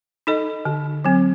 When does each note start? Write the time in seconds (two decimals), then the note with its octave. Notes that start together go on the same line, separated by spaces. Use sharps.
0.27 D#4 A4 D#5
0.65 D3
1.05 F#3 C4